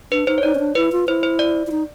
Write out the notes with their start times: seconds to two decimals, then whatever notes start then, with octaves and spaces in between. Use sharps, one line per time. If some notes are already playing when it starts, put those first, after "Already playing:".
0.12 D4 B4
0.27 D#4 C5
0.38 C#5
0.43 D#4 D5
0.55 C#4
0.59 D4
0.75 E4 B4
0.92 F4
1.08 E4 C5
1.23 C5
1.39 D5
1.67 E4
1.71 D#4